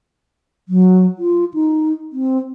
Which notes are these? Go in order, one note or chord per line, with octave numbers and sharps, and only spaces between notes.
F#3
F4
D#4
C4